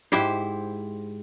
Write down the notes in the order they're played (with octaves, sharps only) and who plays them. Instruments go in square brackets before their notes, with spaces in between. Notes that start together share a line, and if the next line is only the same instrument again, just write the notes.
[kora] G#2 E4 G4 C5